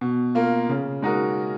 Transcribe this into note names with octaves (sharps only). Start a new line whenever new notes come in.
B2
A#3 F4
C#3
G#3 D#4 F#4 A#4